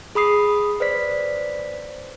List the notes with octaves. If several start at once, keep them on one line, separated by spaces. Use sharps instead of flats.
G#4 B5 D#6 C7
B4 C5 D5 B6